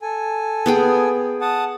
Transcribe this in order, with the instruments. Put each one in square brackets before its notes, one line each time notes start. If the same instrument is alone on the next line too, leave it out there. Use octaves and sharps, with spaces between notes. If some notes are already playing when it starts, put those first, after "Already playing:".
[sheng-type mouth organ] A4 G#5
[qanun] B3 G#4 G5
[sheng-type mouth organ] F#5 A5 D#6